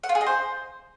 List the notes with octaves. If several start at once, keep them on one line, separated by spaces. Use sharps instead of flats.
F#5
F4
G#4
D#5
C5